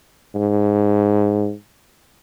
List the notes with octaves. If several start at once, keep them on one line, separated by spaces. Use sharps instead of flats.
G#2